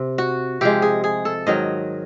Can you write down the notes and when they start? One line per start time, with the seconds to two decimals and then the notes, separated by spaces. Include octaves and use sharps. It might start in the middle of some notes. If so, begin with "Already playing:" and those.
Already playing: C3
0.18 F#4
0.61 C3 F3 G#3 G4
0.82 G#4
1.04 G#4
1.25 A4
1.47 G#2 D#3 F#3 D#5